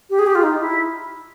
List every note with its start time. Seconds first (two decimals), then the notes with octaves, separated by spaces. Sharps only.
0.10 G4
0.19 G#4
0.27 G4
0.35 F4
0.43 D#4
0.60 E4